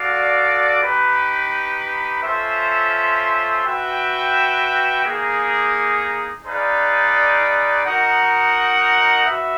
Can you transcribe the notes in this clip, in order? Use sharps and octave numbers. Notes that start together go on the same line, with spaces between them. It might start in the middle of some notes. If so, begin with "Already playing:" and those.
Already playing: F#4 A4 D5 F5
D#4 G4 B4
C#4 F4 A4 C5 E5
F#4 B4 E5 G5
A#3 D#4 G#4
D#4 G#4 B4 D5 F5
D#4 F#4 A#4 D#5 F#5
F#4 B4 E5